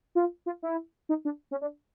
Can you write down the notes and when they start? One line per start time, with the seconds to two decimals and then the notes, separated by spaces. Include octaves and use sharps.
0.15 F4
0.46 F4
0.62 E4
1.09 D#4
1.25 D4
1.51 C#4
1.61 D4